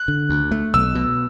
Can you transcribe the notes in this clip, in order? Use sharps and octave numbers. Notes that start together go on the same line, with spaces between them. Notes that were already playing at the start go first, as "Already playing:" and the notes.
Already playing: F#6
D3
D2
A3
B1 E6
B2